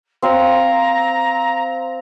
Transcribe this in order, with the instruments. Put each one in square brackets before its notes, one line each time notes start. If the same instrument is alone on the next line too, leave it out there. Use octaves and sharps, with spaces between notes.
[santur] C4 F5 [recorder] A#5